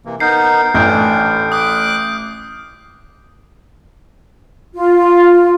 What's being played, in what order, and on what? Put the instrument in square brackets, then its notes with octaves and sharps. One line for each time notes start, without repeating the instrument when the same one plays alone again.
[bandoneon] C3 E3 A#3
[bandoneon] B3 D#4 A#4 [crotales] G6 C7
[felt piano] A1 [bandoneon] E3 D4 [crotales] F6 G6 D7
[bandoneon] D6 F#6 [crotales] D#6
[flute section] F4